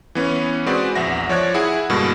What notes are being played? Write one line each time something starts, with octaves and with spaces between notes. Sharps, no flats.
E3 B3 C#4
G#3 C4 F#4 G#4 B4 D5
A#1 E2 E5 F#5 A#6
F3 C#5 D5 F#6 G#6
E4 G#4 F#5
G2 B2 D3 G#3 A#3